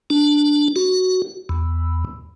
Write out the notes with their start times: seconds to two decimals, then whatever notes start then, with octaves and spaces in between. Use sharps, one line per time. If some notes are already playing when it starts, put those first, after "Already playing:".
0.10 D4
0.76 F#4
1.49 E2